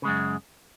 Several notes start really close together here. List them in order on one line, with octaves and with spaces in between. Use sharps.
C#3 G#3 F#2